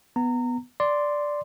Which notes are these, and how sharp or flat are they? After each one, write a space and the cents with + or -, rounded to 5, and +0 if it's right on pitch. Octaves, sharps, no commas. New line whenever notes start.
B3 +0 A#5 -25
D5 +0 C6 -5